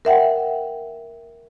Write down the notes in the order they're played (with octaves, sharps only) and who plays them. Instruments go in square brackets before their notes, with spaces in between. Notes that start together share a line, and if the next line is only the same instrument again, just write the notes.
[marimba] A#4 E5 F#5 G5